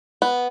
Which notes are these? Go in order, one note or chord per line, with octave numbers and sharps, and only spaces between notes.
B3